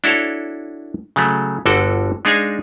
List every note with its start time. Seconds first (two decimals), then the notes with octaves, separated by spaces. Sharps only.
0.04 D4 E4 F#4 A4 C#5
1.16 C#3 F#3 A3
1.66 G1 D3 F#4 A4 G5
2.25 G#3 D4 D#4 G#4 F5 G#5